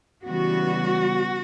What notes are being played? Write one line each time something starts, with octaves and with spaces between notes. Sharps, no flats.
C#3 E3 G3 B3 F#4